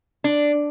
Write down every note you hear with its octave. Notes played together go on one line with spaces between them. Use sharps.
D4